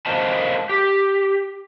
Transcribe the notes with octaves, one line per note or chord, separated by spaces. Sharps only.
A#4 C5 D#5 F5 A5
G4